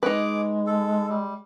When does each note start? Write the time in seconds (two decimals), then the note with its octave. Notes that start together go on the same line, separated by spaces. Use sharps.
0.03 G#3 D#4 G#4 B4 D6
0.67 A4
1.09 G3